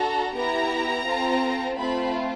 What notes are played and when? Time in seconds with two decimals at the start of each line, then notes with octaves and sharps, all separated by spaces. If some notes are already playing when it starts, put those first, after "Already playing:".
Already playing: D4 F#4 A4 A#5
0.33 B3 E4 G4 A#5
1.05 C4 F4 A4
1.77 A3 C4 F4 B5